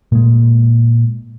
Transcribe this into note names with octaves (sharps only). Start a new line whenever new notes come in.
A#2 G#3